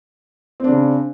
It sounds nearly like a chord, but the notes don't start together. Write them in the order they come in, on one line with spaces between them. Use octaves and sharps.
C4 D4 C#3